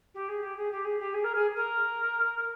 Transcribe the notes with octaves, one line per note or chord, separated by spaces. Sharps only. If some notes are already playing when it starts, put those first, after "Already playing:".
G4
G#4
G4
G#4
G4
G#4
G4
G#4
A#4
G#4
A#4